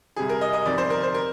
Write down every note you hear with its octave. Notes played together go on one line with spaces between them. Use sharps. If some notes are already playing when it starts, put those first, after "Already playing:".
C2 C3 G3 G#4
A#4
D#5
D#5
G1 F2 C3 D#3 G3 D5
C5
A#4
C5
A#4